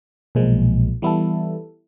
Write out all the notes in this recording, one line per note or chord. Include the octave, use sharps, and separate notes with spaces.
B1 A#2 F3 G#3
E3 G3 B3 E4 A4